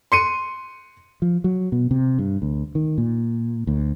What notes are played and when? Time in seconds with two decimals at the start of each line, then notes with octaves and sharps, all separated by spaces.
0.12 C6 C#7 D#7
1.22 F3
1.44 F#3
1.72 B2
1.91 C3
2.19 G2
2.42 D2
2.75 D#3
2.98 A#2
3.67 D2